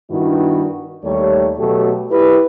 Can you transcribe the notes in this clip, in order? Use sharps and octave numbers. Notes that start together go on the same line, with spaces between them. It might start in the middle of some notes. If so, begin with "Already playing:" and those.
G2 D#3 B3 D4 E4 F#4
D#2 G3 A3 G4 C#5
B2 F#3 A3 F#4 G4 A4
E4 G4 B4